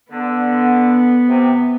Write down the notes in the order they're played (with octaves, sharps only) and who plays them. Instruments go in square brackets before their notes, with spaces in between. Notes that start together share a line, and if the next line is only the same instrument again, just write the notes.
[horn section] D3 [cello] B3
[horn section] C3